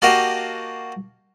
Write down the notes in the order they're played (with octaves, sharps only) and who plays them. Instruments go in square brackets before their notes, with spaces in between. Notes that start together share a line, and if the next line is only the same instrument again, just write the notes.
[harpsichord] A#3 F#4 G4 D#5 F5 A5